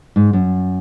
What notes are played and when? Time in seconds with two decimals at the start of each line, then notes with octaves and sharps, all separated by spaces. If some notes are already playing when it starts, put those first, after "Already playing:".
0.16 G#2
0.33 F#2